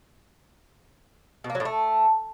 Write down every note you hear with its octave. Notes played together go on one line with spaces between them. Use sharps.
B2
A#3
F#3
A2
A3